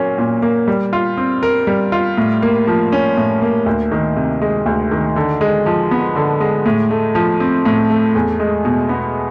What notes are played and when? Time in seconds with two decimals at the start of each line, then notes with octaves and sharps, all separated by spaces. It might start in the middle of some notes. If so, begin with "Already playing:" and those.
Already playing: A#2 F#3 A#3 C#4
0.18 A#2
0.42 A#3
0.68 G3
0.93 F4
1.17 C4
1.43 A#4
1.67 G3
1.92 F4
2.17 A2
2.42 A#3
2.67 F3
2.92 C#4
3.17 A2
3.42 A#3
3.66 D2
3.92 D#3
4.16 C3
4.42 G#3
4.66 D2
4.91 D#3
5.16 D3
5.41 G#3
5.66 F3
5.91 B3
6.16 D3
6.40 G#3
6.66 A2
6.91 A3
7.15 F3
7.40 C4
7.65 A2
7.90 A3
8.15 E2
8.40 G#3
8.65 B2
8.89 B3